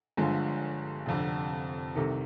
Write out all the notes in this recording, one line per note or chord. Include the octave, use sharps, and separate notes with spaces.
G1 G2 D3 F3 G#3
F1 F2 D3
C2 C3 D#3 A4